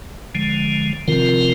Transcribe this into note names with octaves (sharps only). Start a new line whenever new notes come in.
D3 F3 G#3
C3 D#3 F3 C4 F4 A#4